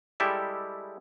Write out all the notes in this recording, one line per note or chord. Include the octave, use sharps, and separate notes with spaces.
G3 G#3 E4 G4 A4 E5